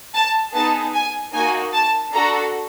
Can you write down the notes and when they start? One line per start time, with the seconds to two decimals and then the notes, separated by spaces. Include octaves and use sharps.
0.15 A5
0.54 B3 D#4 G#4 A5
0.94 G#5
1.34 A#3 D#4 F#4 G#5
1.73 A5
2.13 D4 F#4 A4 A#5